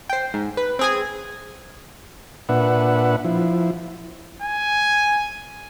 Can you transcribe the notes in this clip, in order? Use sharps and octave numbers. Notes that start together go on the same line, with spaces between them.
C5 G5
G#2
B4
C4 G#4 G#5
A#2 D4 B4 E5 F#5
F3 E4
G#5